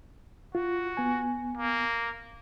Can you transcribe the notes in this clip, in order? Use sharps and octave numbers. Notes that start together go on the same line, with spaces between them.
F4 F#4
B3 G#5
A#3